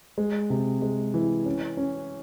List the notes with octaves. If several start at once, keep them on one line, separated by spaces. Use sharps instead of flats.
G#3
C3
G#3
E3
C#4
C#4